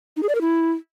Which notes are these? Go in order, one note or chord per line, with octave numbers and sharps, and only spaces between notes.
D#4
G#4
D5
A#4
E4